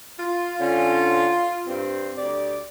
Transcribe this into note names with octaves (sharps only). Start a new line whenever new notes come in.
F4
D3 C#4
G2 C4
D2 G4 D5